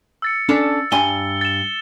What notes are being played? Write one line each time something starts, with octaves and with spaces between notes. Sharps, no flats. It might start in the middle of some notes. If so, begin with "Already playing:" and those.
E6 A6 C#7
C#4 D4 A4
G2 G#5 C6 G7
A6 E7